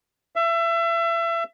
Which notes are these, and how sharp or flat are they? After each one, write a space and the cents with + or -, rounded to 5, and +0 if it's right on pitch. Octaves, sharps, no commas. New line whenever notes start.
E5 +30